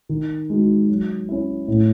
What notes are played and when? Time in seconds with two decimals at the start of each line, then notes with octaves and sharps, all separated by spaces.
0.09 D#3
0.50 G#3 D#4 F#4
0.89 F#3
1.29 C#4 E4
1.68 A2